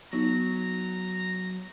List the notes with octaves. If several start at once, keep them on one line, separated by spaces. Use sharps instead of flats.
F#3 B3 D#4 A#5